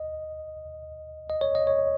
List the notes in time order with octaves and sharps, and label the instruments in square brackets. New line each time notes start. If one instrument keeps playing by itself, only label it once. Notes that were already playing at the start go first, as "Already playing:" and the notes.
Already playing: [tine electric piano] D#5
D#5
C#5
D#5
C#5